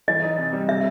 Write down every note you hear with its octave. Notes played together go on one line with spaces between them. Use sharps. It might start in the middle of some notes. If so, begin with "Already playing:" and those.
E3 D#5
D#4
C3
G3
C3 E5